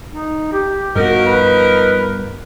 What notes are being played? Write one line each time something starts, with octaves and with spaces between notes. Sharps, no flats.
D#4
G4
G2 F3 B3 D#4 F#4 A#4
B4